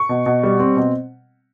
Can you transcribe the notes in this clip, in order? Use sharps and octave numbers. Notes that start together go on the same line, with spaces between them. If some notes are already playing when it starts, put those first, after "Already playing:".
Already playing: C#6
B2
B2
G3
C4
B2